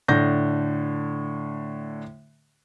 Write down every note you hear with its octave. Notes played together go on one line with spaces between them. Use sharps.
A2 D3 G6 A#6